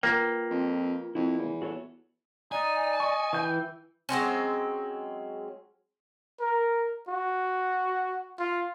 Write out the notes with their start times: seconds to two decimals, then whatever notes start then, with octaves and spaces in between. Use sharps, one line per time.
0.03 A#3 F4 B4 G5
0.50 F2
1.15 F2 E4
1.38 E2
1.62 F#4 A4 C#5
2.52 D#4 D5 G#5
3.00 D#5 C#6
3.33 E3 G5 G6
4.09 F#3 G#3 C4 C#4
6.40 A#4
7.08 F#4
8.40 F4